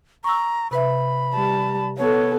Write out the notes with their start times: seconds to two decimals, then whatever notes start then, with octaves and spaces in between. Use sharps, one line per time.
0.24 A#5 C#6 E6
0.71 C3 B4 E5 B5
1.34 G3 A5
1.98 B3 A4 C#5